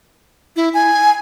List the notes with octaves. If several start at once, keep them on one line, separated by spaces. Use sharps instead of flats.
E4
G#5